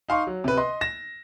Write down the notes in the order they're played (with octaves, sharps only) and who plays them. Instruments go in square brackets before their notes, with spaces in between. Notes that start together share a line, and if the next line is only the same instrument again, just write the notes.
[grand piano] D#4 F5 C6 C#6
F#3
C3 B4
D#5 C6
A#6 E7